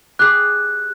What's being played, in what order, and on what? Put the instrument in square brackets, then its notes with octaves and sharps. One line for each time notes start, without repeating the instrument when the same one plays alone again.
[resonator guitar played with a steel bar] G4 G#4 [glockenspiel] F#6